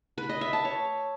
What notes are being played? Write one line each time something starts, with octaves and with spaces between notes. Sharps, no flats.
B4
D#5
E5
A5
C#5